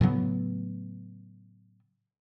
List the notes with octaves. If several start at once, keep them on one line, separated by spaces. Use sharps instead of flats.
A2 C#3 F#3 B3